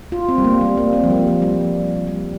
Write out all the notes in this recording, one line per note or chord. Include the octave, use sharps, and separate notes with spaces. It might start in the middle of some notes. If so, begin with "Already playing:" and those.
F4
C4
G3
A#3
G3
A#3
C4
F3
G3
F3
G3
G3